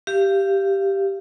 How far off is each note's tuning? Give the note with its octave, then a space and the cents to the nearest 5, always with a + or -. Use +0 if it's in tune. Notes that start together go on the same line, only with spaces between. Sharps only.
G4 +0 F5 -25